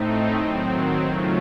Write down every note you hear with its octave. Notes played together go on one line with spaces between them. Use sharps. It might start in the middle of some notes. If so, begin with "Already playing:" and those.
Already playing: A2 A3 C4 D#4
D#3 F#3 C4
C#3 F#3 A3 C#4 F4